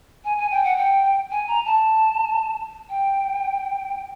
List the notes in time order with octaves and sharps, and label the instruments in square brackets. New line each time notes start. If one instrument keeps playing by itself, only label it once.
[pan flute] G#5
G#5
G5
F#5
G5
G#5
A#5
A5
G5